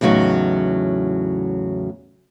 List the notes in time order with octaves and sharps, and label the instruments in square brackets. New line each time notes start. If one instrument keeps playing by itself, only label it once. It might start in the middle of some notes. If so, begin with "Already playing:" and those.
[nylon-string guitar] E2 A2 C#3 F#3 D#4